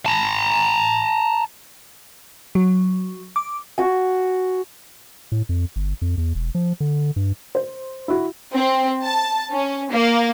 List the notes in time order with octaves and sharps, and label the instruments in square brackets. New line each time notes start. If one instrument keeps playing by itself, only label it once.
[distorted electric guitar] A5 A#5
[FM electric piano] F#3
D6
[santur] F#4 G#5
[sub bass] A2
F2
G1
F2
E2
E1
F3
D3
G2
[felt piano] C5
E4 F#4
[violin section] C4
A5
C#4
A#3